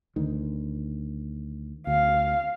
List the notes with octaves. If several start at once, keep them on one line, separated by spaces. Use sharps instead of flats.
D2 D#3
D2 F5